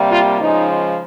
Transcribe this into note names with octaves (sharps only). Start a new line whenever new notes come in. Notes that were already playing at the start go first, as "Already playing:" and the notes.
Already playing: C3 G3 A#3
F4
C#3 F3 G#3 D#4